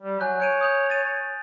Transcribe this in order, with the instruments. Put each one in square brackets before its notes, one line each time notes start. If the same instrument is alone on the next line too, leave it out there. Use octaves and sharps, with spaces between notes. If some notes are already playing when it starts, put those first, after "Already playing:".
[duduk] G3
[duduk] F#3 [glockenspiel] G#5 F#6 G6
[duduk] C#5 [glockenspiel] G6 D7 D#7
[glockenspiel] D#6 G6 F7
A6 D#7